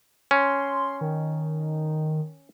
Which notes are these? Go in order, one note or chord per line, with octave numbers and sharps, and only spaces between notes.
C#4 C6
D#3